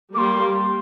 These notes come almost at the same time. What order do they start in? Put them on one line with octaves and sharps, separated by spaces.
G3 A#3 D6 C6